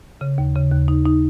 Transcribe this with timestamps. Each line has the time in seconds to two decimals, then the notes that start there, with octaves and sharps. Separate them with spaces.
0.21 C#3
0.38 D#2
0.55 C#3
0.72 D#2
0.88 D#4
1.06 D#4